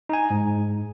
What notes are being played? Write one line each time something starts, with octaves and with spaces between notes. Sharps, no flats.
D#4 G#5
G#2